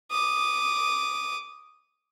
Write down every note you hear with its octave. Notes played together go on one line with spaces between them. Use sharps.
D6 D#6